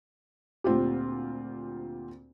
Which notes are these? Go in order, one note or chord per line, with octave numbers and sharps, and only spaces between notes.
D2 A#2 C4 F4 G4